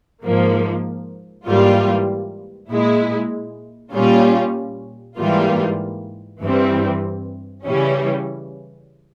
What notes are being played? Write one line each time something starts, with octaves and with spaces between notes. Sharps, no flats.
G#2 F3 A#3
G#2 E3 G3 A#3 F4
A#2 G#3 E4
A#2 G3 C#4 F4
G#2 E3 G3 A#3 F4
G2 E3 G3 C4
C#3 E3 G3 C#4